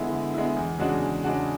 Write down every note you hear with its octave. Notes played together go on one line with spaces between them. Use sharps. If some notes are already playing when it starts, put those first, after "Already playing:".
Already playing: D3 G#3 B3 E4
D3
G#3 B3 E4
E2
C#3 G#3 D4 F#4
E2
C#3 G#3 D4 F#4